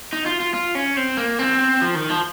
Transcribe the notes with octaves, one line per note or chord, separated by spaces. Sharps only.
D#4
F4
F4
F4
C#4
C4
A#3
C4
F3
D#3
F3